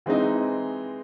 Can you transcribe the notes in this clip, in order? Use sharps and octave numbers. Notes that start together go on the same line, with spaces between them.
E3 G#3 C4 D#4